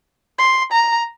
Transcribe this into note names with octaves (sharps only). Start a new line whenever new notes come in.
C6
A#5